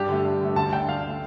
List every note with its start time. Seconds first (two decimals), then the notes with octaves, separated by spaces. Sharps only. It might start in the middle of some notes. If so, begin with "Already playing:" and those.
Already playing: G2 G4
0.09 D3 A3
0.25 G2
0.41 D3 A3
0.56 D2 A5
0.72 D3 A3 G5
0.88 D2 F5
1.04 D3 A3